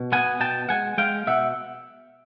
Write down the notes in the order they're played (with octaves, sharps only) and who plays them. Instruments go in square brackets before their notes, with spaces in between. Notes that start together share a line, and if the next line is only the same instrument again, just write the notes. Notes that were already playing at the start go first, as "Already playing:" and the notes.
Already playing: [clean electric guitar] B2
B3 F#5 G#5
B2 G5 A5
G#3 F#5 G#5
G#3 F5 G5
B2 E5 F#5